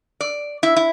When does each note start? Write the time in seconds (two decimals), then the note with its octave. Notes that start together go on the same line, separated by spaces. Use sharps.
0.21 D5
0.63 E4
0.76 E4